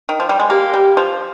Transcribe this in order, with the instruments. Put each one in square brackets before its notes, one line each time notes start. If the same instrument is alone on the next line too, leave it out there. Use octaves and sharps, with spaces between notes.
[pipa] D#3
F3
G3
G#3
[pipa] A#3 [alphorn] G4
[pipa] G3
F3